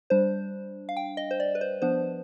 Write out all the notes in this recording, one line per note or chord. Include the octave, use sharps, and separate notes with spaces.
G3 D4 C5
F5
G5
D#5
C5
D5
B4
C5
F3 B3 D4 C5